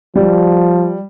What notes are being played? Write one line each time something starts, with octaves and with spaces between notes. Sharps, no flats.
F3 G3